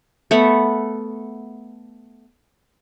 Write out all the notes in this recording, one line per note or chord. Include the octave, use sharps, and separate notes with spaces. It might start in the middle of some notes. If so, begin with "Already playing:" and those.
A3 B3 F#5 B5